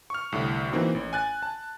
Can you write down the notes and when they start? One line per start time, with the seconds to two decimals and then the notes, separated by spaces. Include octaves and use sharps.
0.10 C#6 F6
0.32 C2 A2 D3
0.71 E3 A#3 C4 D#4 F#4
0.95 A1
1.13 G#5 F#6 A6
1.43 A5